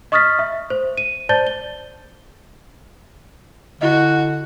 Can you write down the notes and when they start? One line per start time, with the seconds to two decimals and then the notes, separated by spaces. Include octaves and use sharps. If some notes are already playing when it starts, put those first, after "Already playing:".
0.12 D#5 C#6 D#6 F6 A6 B6
0.39 E5
0.70 C5
0.97 D#7
1.29 C5 D5 A5 G6 A6 G7
1.47 G7
3.81 D3 E4 F#4 D#5